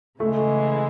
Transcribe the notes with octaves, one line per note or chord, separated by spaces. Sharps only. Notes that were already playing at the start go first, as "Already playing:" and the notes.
C#3 E3 G#3 A3